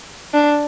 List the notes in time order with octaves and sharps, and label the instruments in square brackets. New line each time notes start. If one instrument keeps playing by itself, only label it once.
[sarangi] D4